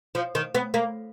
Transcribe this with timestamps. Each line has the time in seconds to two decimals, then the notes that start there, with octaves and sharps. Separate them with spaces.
0.15 F3
0.35 D#3
0.55 B3
0.74 A#3